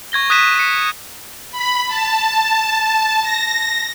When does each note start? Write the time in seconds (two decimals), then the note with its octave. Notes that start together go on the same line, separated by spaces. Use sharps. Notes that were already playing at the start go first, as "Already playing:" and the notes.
0.12 C#6 G#6 A#6 G7
0.30 D#6 F#6 G#6 B6 D#7 E7
0.55 B6 C#7
1.52 B5
1.88 A5
3.21 A#6